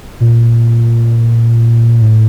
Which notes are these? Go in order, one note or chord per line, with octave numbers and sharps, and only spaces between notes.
A#2
A2